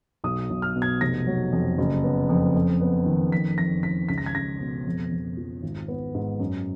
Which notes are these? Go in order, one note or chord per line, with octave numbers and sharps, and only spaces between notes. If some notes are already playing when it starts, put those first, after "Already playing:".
B1 D#6
B1
F6
B2
G#6
F1 A#6
F#3
F2
F#1
B3
F2
F2
B3
D#3
F2 B6
F2 A#6
D#3 B6
C#2 B6
A#6
G#6
C#2 A#6
B2
F2
F2
F3
G#1
B3
G#2
F#2